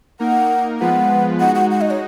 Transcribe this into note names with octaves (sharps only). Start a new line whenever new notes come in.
A#3 D#4 A#4 F#5
F3 G#3 B3 F4 B4 F#5
G#3 D#4 F#4 F#5
F#5
F#5
D#5
C#5